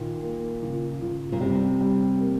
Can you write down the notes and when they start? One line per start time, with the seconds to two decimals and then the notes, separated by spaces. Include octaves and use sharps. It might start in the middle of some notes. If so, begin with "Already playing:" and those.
Already playing: A#2 D#3
0.23 A#3
0.63 C#2
1.02 C#2
1.32 A#2
1.41 C3 G3
1.80 G3
2.20 A#3